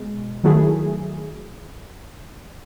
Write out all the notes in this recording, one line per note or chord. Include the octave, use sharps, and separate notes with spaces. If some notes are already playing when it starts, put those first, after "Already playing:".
Already playing: B2 G#3
D#3 F#3 A3 E4 G#4